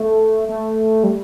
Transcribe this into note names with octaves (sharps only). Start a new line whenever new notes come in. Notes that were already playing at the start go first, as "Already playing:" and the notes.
Already playing: A3
A3
G3